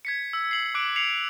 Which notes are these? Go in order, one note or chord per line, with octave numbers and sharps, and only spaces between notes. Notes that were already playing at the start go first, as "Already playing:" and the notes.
G#6 B6 C#7
E6
C7 F#7
D6 F#6 D7
C7 C#7 F7